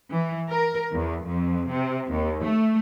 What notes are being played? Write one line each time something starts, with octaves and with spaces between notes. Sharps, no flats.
E3
A#4
E2
F2
C3
D#2
A3